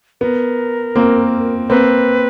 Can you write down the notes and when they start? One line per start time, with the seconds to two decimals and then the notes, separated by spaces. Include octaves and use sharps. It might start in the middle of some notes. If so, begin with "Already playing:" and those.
0.21 B3 A#4
0.96 A#3 C4
1.70 A#3 C4 B4